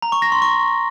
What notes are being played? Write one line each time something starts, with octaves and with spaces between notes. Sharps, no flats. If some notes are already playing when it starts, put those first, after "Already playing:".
A#5
C#6
A#6
C6
C#6